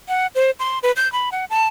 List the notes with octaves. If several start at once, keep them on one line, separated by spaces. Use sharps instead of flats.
F#5
C5
C6
B4
G6
B5
F#5
A5